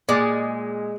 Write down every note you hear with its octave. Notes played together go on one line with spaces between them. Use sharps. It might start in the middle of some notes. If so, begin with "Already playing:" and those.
A#2 G#3 D5